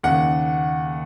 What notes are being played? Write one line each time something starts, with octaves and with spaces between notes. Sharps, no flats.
D#2 C#3 F#5